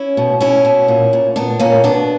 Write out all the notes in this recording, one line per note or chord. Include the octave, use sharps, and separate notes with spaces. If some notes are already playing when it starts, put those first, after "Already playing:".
Already playing: C#4 E4
B2
B2 C#4 E4
B2
A#2
A#2
A#2 B3 D4
A#2 A#3 C#4
B2 B3 D4